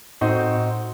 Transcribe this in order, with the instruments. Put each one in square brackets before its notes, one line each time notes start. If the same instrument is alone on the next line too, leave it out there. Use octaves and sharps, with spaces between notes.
[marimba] A2 [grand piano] C4 D#4 F#4